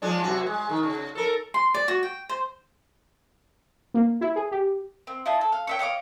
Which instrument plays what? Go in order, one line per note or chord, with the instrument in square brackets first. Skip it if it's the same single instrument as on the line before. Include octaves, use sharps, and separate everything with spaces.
[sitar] F3 G#3 D4
F#2 C3 F#4
G#3
D#3
C#3
A4 A#4
[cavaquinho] C6
D5
F#4
G5
C5
[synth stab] A#3
E4
G#4
G4
[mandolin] C4
E4 F4 D#5 A5
A4
F5
C#5 E5 G5
C#5 D#5 F5 D6